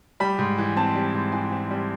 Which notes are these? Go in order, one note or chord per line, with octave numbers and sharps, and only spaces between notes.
G3 B5
G#2
E3
C4 A5
G3
G#2
E3 G#5
C4
G3